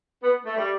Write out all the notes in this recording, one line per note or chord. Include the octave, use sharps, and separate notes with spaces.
B3
A3
G3